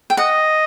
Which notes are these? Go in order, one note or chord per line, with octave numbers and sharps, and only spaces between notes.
G5
D#5 F#5